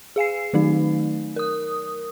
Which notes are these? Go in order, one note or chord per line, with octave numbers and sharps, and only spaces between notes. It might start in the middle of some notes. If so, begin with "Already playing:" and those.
G#4 F5 G#5 C7
D#3 F#3 A3 D#4
A#4 D#6